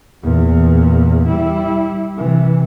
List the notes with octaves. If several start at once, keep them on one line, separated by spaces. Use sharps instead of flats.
E2 A#2
G3 E4
C3 E3